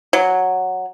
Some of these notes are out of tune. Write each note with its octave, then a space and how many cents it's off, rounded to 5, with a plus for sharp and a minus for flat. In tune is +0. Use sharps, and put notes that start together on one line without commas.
F#3 -5